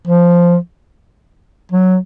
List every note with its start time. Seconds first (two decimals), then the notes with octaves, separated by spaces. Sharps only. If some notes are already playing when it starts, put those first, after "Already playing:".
0.07 F3
1.72 F#3